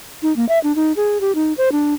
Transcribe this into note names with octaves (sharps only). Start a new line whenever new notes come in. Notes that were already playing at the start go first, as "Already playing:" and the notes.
D#4
A#3
E5
D4
D#4
G#4
G4
D#4
C5
D4